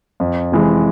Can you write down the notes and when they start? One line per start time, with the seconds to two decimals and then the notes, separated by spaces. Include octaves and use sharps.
0.20 F2
0.52 C3 E3 G#3